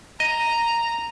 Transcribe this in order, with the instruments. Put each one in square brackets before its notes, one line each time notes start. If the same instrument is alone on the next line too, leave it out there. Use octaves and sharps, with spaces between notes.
[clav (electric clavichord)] D#5 [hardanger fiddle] A#5